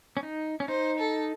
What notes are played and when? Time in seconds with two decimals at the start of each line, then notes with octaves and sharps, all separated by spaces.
0.17 C#4
0.23 D#4
0.60 C#4
0.68 D#4 C5
0.99 A4